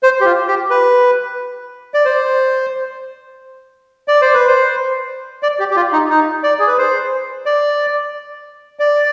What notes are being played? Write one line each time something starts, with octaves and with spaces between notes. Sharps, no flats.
C5
G4
F4
G4
B4
D5
C5
D5
C5
B4
C5
D5
G4
G4
F4
D#4
D#4
D5
G#4
B4
C5
D5
D5